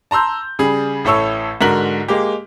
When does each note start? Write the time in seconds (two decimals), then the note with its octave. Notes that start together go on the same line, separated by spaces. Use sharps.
0.11 A5 A#5 C6 E6 G6
0.59 C#3 G3 G#4
1.05 A1 A2 A4 C#5 C#6 E6
1.61 G#2 D3 F#4 A#4 B6 F#7
2.08 G#3 A#3 G4